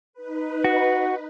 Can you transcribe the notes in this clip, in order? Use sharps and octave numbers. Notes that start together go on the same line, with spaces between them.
D#4 B4
F#4